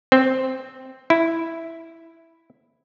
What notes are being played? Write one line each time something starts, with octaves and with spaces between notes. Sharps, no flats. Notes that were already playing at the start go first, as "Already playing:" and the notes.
C4
E4